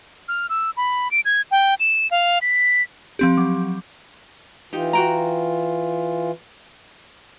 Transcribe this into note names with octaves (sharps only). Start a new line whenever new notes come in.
F6
E6
B5
D7
G#6
G5
E7
F5
B6
F3 C4 G4
F#3 D6
E3 D#4 F4 G4
F#4 G5 A#5